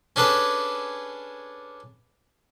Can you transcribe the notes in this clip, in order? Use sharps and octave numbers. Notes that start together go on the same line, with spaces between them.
C#4 D4 G#4 A4 B4